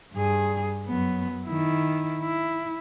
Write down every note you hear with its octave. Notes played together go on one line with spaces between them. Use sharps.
G2 G#4
F#2 B3
D#3 E4
E4